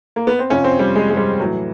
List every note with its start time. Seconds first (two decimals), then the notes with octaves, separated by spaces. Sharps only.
0.16 A#3
0.27 B3
0.39 C4
0.50 F2 C3 F3 C#4
0.64 C4
0.79 G3
0.95 G#3
1.10 G#3
1.17 G3
1.40 A2 E3 F#3